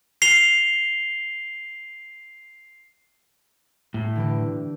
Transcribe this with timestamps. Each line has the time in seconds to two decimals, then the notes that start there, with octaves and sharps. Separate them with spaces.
0.22 C7 F7 G7
3.94 A2
4.15 D3 E3 G4